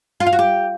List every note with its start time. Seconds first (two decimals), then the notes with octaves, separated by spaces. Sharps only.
0.20 F4
0.26 F5
0.33 F#4
0.39 G4